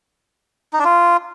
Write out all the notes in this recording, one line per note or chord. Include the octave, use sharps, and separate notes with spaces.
D#4
D4
F4